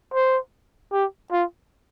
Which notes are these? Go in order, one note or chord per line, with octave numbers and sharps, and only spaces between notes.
C5
G4
F4